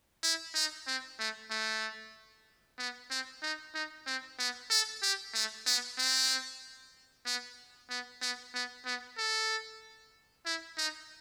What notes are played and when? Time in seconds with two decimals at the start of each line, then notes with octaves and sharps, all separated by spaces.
0.23 E4
0.54 D#4
0.87 C4
1.19 A3
1.51 A3
2.79 B3
3.10 C4
3.42 D#4
3.74 D#4
4.07 C4
4.38 B3
4.70 A4
5.02 G4
5.34 A3
5.66 B3
5.98 C4
7.26 B3
7.90 B3
8.21 B3
8.54 B3
8.86 B3
9.18 A4
10.46 E4
10.77 D#4